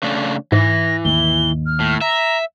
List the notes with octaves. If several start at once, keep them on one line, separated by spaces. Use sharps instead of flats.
C#3 A3 D4
G#2 E3 A#6
D#2 G7
F6
A2
E5 A#5